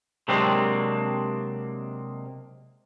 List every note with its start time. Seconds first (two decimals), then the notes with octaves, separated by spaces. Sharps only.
0.28 C3 F#3 G#3 A#3 C4 D4